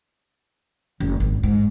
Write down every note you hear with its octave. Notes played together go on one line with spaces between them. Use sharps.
F#1
G#1
G#2